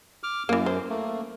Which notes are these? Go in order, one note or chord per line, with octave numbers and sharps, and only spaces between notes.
D6 F6
F#2 E3 A#3
C5
A3 A#3